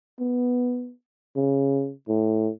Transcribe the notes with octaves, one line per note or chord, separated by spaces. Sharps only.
B3
C#3
A2